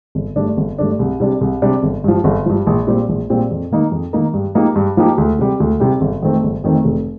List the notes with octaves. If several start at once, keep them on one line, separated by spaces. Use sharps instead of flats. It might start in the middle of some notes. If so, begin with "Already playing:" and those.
G1
G2 D3 A3 D4
G1
G2 D3 A3 D4
C2
C3 G3 D4
C2
C3 G3 D4
G1
G2 F3
G1
G2 F3
A#1
A#2 G3 C4
A#1
A#2 G3 C4
F2
D#3 A#3 D#4 A#4
F2
D#3 A#3 D#4 A#4
G2
F3 A#3 D#4 G4
G2
F3 A#3 D#4 G4
D2
C3 G3
D2
C3 G3
G1
F2 D#3 A3 C4
G1
F2 D#3 A3 C4
F1